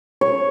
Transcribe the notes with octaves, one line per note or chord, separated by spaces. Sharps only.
C#5